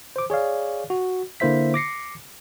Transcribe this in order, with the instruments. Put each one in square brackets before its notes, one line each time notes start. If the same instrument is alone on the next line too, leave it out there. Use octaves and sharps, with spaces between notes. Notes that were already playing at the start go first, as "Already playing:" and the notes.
[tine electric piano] C5 D6
G#4 C#5 D5 F5
F#4
D3 A#3 E4 C5 E5 B6
D6 A#6 C7 C#7